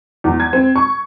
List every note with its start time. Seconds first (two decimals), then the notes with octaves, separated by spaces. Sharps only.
0.24 E2
0.40 G#6
0.53 C4
0.76 C#6